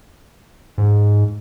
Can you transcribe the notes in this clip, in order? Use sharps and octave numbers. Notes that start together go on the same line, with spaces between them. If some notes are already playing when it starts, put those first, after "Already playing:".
G#2